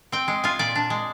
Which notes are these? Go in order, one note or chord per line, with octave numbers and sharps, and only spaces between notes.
C4 G5
G#3
F4 G#5
A#2 D5
D4
G#3